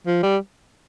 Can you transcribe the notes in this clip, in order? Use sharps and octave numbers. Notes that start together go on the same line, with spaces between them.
F3
G3